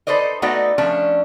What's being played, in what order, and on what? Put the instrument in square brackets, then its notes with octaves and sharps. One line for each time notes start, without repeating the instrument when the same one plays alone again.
[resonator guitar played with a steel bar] D#4 A4 B4 C5 D5 D#5
A3 B3 D#4 F#4 D5
F3 A3 C#4 D4